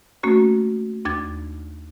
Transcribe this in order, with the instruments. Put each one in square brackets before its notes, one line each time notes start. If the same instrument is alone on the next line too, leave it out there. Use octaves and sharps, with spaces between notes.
[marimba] A3 A#3 C#4 F#4
D#2 D4 G#6 A6